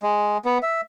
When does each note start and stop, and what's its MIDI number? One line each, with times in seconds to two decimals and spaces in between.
0.03 0.38 56
0.45 0.58 59
0.63 0.81 76